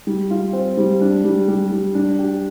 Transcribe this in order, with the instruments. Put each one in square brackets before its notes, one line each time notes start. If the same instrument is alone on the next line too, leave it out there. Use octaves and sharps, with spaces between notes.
[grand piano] G3
F4
C4
G3
D4
G3
G3
G3
D4
G4